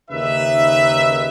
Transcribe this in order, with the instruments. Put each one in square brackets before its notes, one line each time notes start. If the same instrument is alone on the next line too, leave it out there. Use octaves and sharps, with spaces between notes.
[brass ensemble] D#2 C#3 D#4 B4 E5